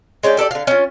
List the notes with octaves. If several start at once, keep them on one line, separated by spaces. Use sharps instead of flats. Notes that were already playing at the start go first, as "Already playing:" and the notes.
G#3 C#4 D5 G5
G4 A4 B4 D5
D3 F5
C#4 F4